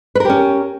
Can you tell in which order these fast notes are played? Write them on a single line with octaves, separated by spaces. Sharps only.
B4 A#4 G4 C#4